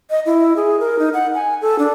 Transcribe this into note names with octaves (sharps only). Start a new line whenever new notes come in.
D#5
E4
G#4
A#4
D#4
F#5
G#5
A4
D4